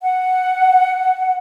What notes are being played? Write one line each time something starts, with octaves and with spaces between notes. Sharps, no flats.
F#5